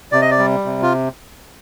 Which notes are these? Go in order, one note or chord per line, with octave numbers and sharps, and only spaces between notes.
C3 D5
D#5
D5
G3
C3
F4